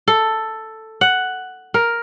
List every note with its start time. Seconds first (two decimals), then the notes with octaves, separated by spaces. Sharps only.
0.08 A4
1.01 F#5
1.74 A#4